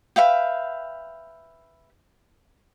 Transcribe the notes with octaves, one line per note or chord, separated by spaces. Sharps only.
B4 E5 F5 G5